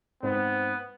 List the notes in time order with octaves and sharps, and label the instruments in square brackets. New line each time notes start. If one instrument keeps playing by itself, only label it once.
[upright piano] G#2 C4 [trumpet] B3